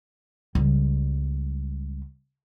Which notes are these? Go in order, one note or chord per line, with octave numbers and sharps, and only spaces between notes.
C#2 G3